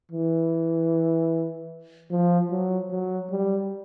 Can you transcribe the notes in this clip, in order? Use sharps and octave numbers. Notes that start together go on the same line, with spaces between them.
E3
F3
F#3
F#3
G3